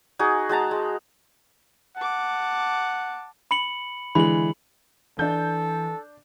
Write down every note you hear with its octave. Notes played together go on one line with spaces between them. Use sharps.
D#4 F#4 G#4
G#3 F#4 A5 A#5
G#3
F#5 A5 D6
B5 C#7 F#7
D3 E3 G#3 B5 F#7
E3 D4 A4 G6